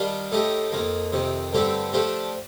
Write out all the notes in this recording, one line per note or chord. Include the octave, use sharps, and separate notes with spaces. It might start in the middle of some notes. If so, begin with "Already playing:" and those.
Already playing: D#3 G3 D4 F4
A2 A3 D#4 G4
F2 D#3 A#3
F2 C3 D#3
G2 D3 A3 C4 G4
F3 A3 D4 G4